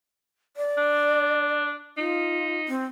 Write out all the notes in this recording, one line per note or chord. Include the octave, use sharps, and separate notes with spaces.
D5
D4
D#4 F4
C4